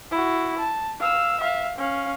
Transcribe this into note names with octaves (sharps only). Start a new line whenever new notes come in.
E4 F#4
A5
F5 E6
E5 F5
C#4 F5